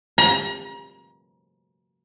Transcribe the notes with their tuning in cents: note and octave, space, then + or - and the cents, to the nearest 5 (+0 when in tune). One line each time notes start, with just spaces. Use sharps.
A#5 +35